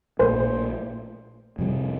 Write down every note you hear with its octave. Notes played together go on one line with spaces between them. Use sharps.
A#1 A#2 A3 C5
F2 C3 G3